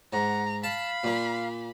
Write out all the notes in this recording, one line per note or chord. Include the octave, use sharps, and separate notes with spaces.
G#2 F#5 A#5
F5 A5 B5
A#2 A#3